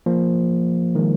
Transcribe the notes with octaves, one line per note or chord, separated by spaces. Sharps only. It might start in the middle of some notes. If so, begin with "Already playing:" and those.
F3 A#3
D#3 G#3